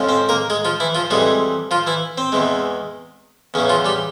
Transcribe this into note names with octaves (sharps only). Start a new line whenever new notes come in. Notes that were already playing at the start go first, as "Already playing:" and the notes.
Already playing: F2 C#3 F3 G#3
C4
A#3 A#4
G#3 G#4
F3 F4
E3 E4
F3 F4
F2 E3 G3 G#3 G#4
F3 F4
E3 E4
C4
E2 E3 G#3
E2 C#3 E3 C#4
F3 F4
G3 G4